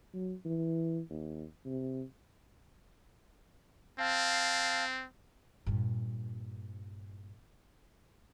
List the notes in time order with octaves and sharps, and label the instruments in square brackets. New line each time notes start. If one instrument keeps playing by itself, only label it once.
[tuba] F#3
E3
D#2
C3
[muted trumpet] C4 [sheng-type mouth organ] F5 A5
[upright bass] G2 A#2